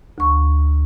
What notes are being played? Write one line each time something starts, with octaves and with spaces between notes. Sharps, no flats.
D2 C#6